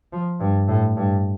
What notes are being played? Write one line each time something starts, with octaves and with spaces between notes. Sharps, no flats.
F3
G2
A2
G2